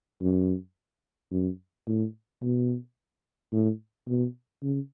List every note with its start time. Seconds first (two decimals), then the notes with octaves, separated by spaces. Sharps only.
0.21 F#2
1.31 F#2
1.87 A2
2.42 B2
3.52 A2
4.08 B2
4.63 C#3